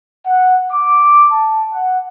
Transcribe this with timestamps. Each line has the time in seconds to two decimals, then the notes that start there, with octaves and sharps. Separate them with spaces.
0.25 F#5
0.72 D6
1.31 A5
1.72 F#5